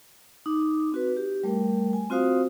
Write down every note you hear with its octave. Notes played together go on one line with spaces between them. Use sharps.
D#4 D6
C4 F#4 B4
G4
G3 A3 A#4 G5
G#5
C4 F4 F#4 C5 F5 D#6